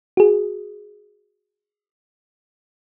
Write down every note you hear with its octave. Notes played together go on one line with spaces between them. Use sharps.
F#4 G#4